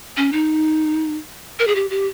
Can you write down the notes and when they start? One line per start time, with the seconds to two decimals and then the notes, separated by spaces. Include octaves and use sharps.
0.17 C#4
0.33 D#4
1.59 A#4
1.67 G#4
1.75 G4
1.90 G4